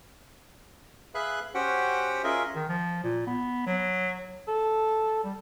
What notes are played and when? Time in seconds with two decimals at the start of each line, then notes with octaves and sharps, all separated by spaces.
1.15 G#4 B4 E5 F5 B5 F#6
1.55 C#4 F#4 G4 C5 F#5 G5
2.24 C#4 F4 G#4 A#4 D#5 E5
2.55 D#3
2.69 F3
3.03 A#2
3.27 B3
3.66 F#3
4.48 A4
5.24 G3